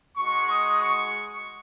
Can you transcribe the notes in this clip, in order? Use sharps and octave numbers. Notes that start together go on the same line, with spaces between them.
G#3 D#4 F#4 C#6
D#6
C#6